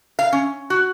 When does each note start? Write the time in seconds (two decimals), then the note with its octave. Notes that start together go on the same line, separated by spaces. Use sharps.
0.19 F5
0.33 C#4
0.70 F#4